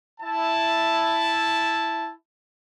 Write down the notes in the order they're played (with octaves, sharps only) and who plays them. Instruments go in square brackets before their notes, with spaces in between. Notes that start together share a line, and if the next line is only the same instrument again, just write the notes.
[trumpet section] E4 A5